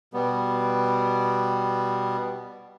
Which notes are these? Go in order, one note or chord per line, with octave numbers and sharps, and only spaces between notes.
B2 G3 B3